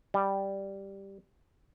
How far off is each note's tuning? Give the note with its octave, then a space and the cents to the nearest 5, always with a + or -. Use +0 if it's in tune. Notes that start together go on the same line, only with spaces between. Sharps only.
G3 +0